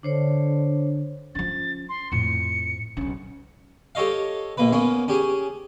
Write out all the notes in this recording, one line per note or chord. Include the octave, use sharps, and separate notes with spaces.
D3 D4 C5 C#5
F3 C#4 A6
C6
F2 A2 C#7
B1 C#3
G4 A4 C#5 D#5 F5
A#1 A#3 B4
A#3 B3 C#4
C#4 G4 G#4